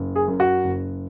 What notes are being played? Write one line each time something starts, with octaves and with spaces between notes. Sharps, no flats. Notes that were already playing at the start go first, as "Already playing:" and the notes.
Already playing: F#1
G#4
F#2
F#4
F#1